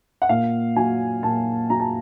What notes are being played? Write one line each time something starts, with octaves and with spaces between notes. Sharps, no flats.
F#5
A#2 F5
F#3 G#5
A#2 A5
F#3 A#5
A5